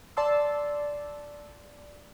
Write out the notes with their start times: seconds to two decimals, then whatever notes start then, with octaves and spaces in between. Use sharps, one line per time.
0.17 D5 A5 C6 E6